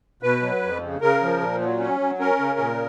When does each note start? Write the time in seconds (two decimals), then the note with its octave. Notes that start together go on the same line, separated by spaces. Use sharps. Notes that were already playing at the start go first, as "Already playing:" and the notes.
0.23 B2 B4
0.42 F#3
0.63 F2
0.82 C#3
1.01 C#3 A#4
1.22 F3
1.40 A#2
1.61 F#3
1.80 C#4
2.00 F#3
2.20 C#4 A#4
2.39 C#3
2.59 A#2